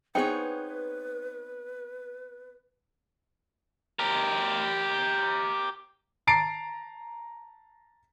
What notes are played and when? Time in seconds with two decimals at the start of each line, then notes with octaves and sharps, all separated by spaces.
0.15 B3 C4 D#4 G#4 B4 C#5 G5
3.99 G4 A#4
6.27 A5 A#5 A6 C7 D7